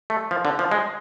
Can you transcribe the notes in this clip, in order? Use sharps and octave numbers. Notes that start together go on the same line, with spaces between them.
A3
F3
D3
F3
G#3